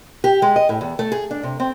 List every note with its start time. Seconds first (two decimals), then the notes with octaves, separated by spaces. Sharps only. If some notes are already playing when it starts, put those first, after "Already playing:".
0.24 G4
0.42 G#3
0.56 D#5
0.69 A2
0.81 E2
0.99 A3
1.12 G#4
1.31 D4
1.43 C3
1.60 C4